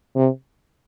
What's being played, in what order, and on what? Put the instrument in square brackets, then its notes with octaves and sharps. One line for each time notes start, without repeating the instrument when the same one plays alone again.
[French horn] C3